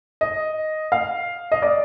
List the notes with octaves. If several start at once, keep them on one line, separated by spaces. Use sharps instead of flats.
D#5
F5
D#5
D5